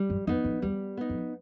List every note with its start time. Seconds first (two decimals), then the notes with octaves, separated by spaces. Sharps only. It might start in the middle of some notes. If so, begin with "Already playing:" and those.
Already playing: G3
0.10 F#2
0.27 F2 B3 D#4
0.44 F2
0.62 E2 G3
0.97 B3 D#4
1.09 F2